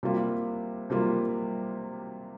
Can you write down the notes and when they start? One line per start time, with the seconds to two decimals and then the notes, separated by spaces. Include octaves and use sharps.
0.03 C3 G3 A#3 F4
0.90 C3 G3 A#3 F4